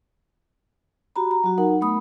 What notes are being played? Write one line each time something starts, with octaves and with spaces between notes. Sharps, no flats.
F#4 G4 A#5 B5
A#5
F#3 F#4
D#4 A#4 F#5
A3 B3 B5 D#6